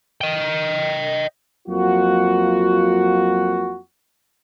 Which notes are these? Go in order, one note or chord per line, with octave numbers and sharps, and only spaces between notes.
D#5 G5
F2 F#3 A#3 F4 F#4